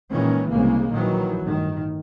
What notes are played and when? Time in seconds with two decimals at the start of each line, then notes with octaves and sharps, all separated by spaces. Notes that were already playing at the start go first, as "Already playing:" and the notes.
0.11 A#2 D#3 E3 G#3 C#4
0.51 C2 C#3 G#3 A#3
0.91 A#1 D#3 E3 F#3
1.42 G1 A2 D#3